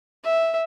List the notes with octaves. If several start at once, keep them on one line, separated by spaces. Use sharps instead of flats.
E5